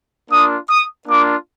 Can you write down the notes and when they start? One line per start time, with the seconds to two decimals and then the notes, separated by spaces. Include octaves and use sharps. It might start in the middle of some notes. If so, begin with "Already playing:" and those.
0.30 A#3 D4 F4 D#6
0.70 D#6
1.08 A#3 D4 F4 D6